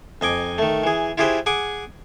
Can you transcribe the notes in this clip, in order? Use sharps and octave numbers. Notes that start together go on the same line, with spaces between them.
F2 D#5 G#5 D6
D#3 A3
E3 G#4
E4 F4 G4 G#4 B4 C5
G#4 F#5 G#5 D6